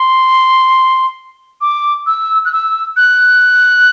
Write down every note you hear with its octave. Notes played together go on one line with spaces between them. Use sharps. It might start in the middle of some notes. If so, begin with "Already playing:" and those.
Already playing: C6
D6
E6
F#6
E6
F#6